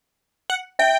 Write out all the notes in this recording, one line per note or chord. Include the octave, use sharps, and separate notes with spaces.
F#5
E5 G5